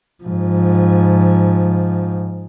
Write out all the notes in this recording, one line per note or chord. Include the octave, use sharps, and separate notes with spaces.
G#2 F3